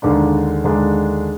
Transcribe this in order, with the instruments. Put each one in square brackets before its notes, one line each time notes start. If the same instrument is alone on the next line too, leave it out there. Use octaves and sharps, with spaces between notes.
[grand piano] D#2 D3 G#3 D4
D#2 D3 G#3 D4